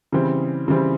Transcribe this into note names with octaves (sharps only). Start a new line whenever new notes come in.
C#3 E3 G3 C4
C#3 E3 G3 C4